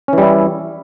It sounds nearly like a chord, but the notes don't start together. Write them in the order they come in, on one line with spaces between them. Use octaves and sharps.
C#4 E3 G3 E4